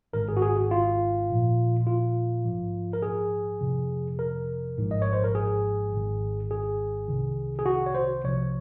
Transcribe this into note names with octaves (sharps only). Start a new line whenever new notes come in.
G#1 G#2 D#3 A#4
G#4
F#4
G#4
F#4
F4
A#1 A#2 F3
F4
A#1 G#2 F3
A#4
G#4
F2 C3 F3
A#4
G#1 G#2 F3
D#5
C#5
C5
A#4
G#4
G#1 G#2 D#3
G#4
C2 C3 D#3
G#4
F#4
C#5
C5
C2 C3 F3 C#5